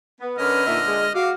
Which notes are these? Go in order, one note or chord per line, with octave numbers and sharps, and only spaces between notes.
B3
D3 C#4 A#4 B4 D#5 F6
A#2 D#4 E5
G#3
F#4 F5 D6